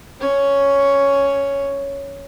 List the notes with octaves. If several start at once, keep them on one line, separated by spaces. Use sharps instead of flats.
C#4 C#5